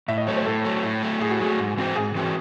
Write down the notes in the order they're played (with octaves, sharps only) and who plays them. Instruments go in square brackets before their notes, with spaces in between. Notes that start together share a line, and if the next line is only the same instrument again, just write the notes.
[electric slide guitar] A2 [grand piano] E5
[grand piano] D#5
[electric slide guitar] F#3 A3 [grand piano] C#5
[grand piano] C5
[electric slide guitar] A2 [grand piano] A4
[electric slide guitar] F#3 A3
A2
F#3 A3
[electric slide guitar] A2 [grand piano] G#4
[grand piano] F#4
[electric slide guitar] F#3 A3 [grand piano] G#4
[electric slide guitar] G#2
E3 C4 F#4 C5
[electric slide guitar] G#2 [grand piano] G#4
[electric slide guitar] E3 C4 F#4 C5